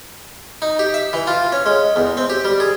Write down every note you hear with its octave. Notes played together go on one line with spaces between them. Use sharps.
D#4
G4
E5
E3
F4
C#4
G#3
E2
C4
G4
G3
G#4